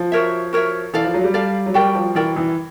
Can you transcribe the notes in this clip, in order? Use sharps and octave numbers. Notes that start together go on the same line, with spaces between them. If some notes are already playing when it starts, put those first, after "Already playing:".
Already playing: F3
F#4 A#4 C#5 E5
F#4 A#4 C#5 E5
E3 A4 D5 F5
F3
F#3
G3
A4 D5 F5
F#3
G3 F#4 A#4 D5 G5
F3
E3 F#4 A#4 D5 G5
E3